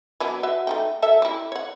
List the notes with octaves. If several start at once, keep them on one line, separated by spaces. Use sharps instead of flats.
F#3 B3 D4
F#4 B4 E5
A3 D#4 G5
F#3 A4 E5
E4 G4
C#5 F#5